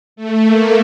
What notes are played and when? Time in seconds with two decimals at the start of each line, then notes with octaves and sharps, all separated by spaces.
0.16 A3
0.45 A#3